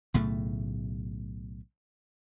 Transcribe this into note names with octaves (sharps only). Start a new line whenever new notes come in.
B1 A2 C#3 A3